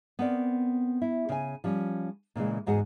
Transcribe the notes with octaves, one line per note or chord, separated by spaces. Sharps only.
B3 C4 A#4 D5
E4
C#3 G#5
F3 G3 C#4
A#2 C#3 E3 G#3
E2 G#2 F#4 G#4 F#5